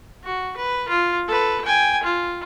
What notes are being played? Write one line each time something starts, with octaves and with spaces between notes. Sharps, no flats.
F#4
B4
F4
A4 B4
G5 G#5
F4